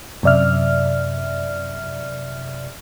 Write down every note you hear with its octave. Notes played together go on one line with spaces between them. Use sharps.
F#2 C3 D5 E5 F6